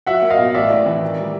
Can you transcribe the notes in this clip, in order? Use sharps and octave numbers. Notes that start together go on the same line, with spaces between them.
F#3 E5 F#5
A#3
D#5 F5
B2
A1 D5 E5
A1
E3
D#3
G3